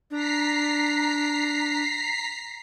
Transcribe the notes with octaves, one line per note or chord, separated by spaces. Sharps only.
D4 A#5 B6 C7